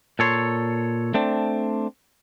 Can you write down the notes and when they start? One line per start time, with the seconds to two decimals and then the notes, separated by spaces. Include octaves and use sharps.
0.19 A#2 A4 C#5 C6
1.14 A3 C4 D4